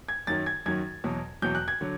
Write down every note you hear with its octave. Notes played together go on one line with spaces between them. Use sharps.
G#6
F#2 D#3 F#3 A6
G#6
F#2 D#3 F#3 G#6
E2 B2 F#3
E2 B2 F#3 G6
F#6
G#6
D3 F#3